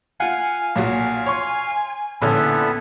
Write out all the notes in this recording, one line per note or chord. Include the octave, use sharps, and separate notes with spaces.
F4 F5 F#5 G#5
B1 A#2 F#4 G#5
C#5 C6 C#6
A#1 D3 B3 C#4 E4 A4